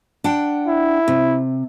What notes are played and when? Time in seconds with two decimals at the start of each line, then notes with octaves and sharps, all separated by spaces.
0.24 D4 F#5 G5
0.68 E4
1.08 C3